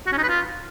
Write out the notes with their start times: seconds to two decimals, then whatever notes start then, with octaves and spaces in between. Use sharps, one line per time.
0.07 F#4
0.12 C#4
0.18 D#4
0.23 B4
0.29 F4